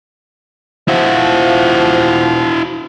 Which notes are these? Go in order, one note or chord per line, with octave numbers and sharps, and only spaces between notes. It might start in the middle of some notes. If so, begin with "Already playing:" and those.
F3 E4 F#4